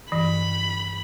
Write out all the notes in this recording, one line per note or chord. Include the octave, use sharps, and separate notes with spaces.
G2 E3 B5